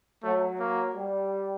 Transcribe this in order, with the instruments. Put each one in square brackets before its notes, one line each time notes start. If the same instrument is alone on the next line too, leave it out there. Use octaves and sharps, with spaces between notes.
[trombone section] F#3 [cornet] A3
[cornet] A#3
[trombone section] G3